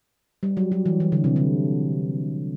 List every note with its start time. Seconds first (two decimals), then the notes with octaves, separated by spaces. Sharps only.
0.43 G3
0.57 F#3
0.72 F#3
0.86 E3
1.00 E3
1.12 D3
1.24 C3
1.36 D3